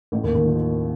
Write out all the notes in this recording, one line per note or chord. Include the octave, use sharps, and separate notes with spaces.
A1 A2
D#2 D#3
D#2 D#3
F3